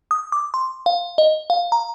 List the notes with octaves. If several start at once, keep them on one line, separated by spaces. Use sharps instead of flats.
D#6
D6
C6
F5
D#5
F5
A#5